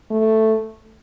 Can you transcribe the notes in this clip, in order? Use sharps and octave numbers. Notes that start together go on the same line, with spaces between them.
A3